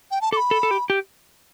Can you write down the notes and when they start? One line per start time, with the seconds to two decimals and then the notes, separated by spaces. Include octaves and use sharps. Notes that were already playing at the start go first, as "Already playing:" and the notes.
0.11 G5
0.21 A5
0.32 A4 D6
0.37 B5
0.51 A4
0.63 A4
0.71 G4
0.90 G4